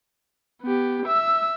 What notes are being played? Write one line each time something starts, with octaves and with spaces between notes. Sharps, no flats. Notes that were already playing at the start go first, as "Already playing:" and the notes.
B3 G4
E5 E6